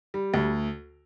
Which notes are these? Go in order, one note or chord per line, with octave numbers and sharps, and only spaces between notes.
G3
D2